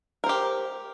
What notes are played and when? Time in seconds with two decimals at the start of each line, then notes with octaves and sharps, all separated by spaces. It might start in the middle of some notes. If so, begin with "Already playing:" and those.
0.24 A#4
0.26 C5
0.29 G4